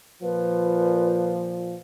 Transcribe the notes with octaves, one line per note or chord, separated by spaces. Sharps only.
A#2 F3 B4